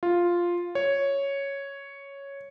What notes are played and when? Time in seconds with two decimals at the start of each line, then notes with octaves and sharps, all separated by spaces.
0.03 F4
0.75 C#5